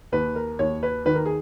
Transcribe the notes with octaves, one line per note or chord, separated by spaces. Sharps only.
D#2 B4
A#4
D#2 C#5
B4
D#3 B4
A#4
G#4